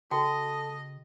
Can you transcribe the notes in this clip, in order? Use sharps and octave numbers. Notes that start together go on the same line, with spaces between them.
C#3 F#4 A4 D#5 G5 A5